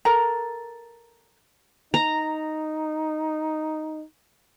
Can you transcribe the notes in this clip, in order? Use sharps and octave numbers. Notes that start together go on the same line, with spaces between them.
A4 A#4 A#5
D#4 A#5